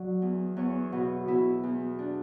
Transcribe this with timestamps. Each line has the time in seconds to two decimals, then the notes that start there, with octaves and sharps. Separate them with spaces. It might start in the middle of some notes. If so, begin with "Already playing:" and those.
Already playing: F#3 D5
0.22 E2
0.57 E2 C#5
0.92 B2
1.27 B2 E4
1.63 E2
1.99 D4